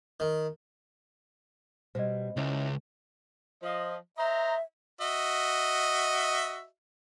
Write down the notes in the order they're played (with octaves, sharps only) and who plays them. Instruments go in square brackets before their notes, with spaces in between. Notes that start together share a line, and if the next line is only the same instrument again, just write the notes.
[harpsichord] D#3
[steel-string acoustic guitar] B2 G3 [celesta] C5 D#5
[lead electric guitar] C#2 [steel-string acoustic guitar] C#4 E4 C#5
[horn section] F3 D#5
[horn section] C5 D#5 A#5 [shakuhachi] E5
[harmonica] F#4 D#5 E5